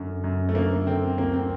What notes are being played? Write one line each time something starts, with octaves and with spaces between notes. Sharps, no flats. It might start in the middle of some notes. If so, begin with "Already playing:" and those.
Already playing: F#2 D3
F#2
A3
D3 A#3
D3 C4
D2 A#3
C4